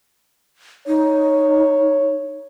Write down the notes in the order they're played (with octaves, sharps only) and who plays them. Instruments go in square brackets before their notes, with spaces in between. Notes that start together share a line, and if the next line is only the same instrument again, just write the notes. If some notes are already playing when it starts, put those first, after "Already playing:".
[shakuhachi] D#4 [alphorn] C#5